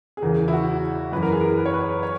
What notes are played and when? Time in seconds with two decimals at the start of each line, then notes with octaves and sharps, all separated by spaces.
0.17 G#4
0.22 E2 C#3 E3 A#4
0.48 E4
0.53 F#4
1.12 F#2 E3 B4
1.23 A#4
1.32 G#4
1.41 A#4
1.57 B4
1.66 C#5
1.74 B4
2.03 C#5